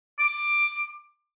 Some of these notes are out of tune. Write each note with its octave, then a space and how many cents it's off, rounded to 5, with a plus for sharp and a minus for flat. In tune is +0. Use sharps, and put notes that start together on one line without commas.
D6 +15